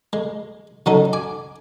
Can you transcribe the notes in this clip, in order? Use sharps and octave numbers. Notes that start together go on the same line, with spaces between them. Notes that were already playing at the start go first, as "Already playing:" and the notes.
G#3
C#3 F#3 C#4 D#4 A4
G#5 D6